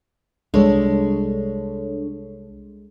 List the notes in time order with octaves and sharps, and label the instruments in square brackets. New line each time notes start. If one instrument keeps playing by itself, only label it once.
[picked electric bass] C2 G3 [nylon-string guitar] G#3 [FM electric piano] D4 A4 C#5